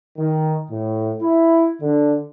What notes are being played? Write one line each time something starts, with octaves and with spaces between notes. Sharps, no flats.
D#3
A2
E4
D3